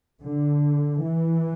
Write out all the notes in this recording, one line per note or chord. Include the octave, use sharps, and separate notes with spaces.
D3
E3